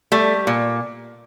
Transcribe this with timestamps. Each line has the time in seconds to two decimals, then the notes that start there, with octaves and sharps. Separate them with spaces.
0.12 G3 A3
0.47 A#2